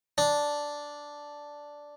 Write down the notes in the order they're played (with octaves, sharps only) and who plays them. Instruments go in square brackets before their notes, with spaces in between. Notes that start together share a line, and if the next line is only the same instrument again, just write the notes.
[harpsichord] D4